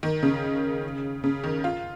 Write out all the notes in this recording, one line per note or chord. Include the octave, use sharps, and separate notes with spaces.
D#3
C#3
C#3
D#3
F4